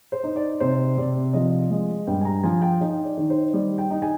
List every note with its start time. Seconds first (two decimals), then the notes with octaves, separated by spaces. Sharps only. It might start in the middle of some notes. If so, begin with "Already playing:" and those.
0.12 C5
0.24 D#4
0.36 D5
0.60 C3 C5
0.97 C3 D5
1.33 F3 D#5
1.70 G#3
2.07 G2 G5
2.21 G#5
2.25 A#5
2.43 F3 G#5
2.62 G5
2.81 D#4 D#5
3.05 D5
3.17 D#3
3.30 C5
3.54 G3 D5
3.78 G5
3.90 D#4
4.02 G#5